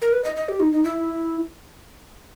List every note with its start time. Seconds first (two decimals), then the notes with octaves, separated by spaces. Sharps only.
0.02 A#4
0.13 B4
0.24 D#5
0.36 D#5
0.49 G4
0.60 D#4
0.72 D#4
0.84 E4